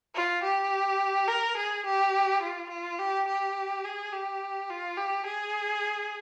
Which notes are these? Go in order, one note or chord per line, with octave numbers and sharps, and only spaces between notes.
F4
G4
A#4
G#4
G4
F4
F4
G4
G4
G#4
G4
F4
G4
G#4